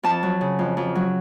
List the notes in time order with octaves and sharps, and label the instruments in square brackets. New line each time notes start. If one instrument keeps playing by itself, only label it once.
[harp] F2 A5
F#3
C#3
F2
F2
F#3